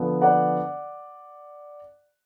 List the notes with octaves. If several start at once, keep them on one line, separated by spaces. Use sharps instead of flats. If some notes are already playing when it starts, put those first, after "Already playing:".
Already playing: D3 F3 B3 D4
D5 F#5